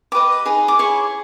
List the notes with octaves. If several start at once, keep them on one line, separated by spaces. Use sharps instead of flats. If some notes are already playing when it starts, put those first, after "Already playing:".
G4 B4 D#5 D6
D#4 G#4 B4
D6
E4 G#4 C#5 C#6